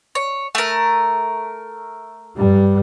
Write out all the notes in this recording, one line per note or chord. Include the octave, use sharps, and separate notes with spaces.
C#5
A3 A#4
G2 G3